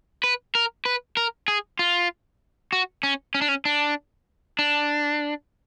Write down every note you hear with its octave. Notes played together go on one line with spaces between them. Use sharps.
B4
A#4
B4
A#4
G#4
F4
F#4
C#4
C#4
D4
C#4
D4
D4